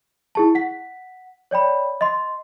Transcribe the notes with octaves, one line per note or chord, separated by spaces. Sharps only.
E4 G#4 A5
F#5 B6
C#5 D5 G5 B5
D#5 C6